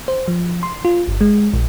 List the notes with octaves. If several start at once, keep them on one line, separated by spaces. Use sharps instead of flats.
C5
F3
C6
F4
G1
G#3
A#1